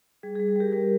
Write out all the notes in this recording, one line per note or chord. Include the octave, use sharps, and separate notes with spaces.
G3 G#4
G#4
G3
G#4
G3 G4 A#4
G3 G4 A#4